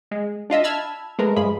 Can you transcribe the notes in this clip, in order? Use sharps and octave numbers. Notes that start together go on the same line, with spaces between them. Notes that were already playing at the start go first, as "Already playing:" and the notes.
G#3
D4 F4 D#5 E5
A5 B5 E6 F6 G#6
G#3 A3 A#4 B4
G2 F3 G#3 G#4 B5